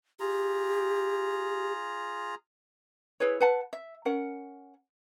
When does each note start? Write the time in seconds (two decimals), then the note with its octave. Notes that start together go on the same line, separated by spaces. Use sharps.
0.20 F4 G4 G#4 A#5
3.20 E4 G#4 B4 C#5
3.40 B4 F#5 A5
3.73 E5
4.05 C#4 A#4 F#5